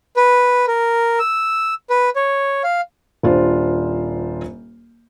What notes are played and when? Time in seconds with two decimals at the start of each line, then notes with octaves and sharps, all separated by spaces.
0.17 B4
0.68 A#4
1.19 E6
1.90 B4
2.16 C#5
2.64 F5
3.23 D#1 D4 F4 C5